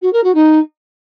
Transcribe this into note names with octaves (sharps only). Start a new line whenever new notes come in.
F#4
A#4
F#4
D#4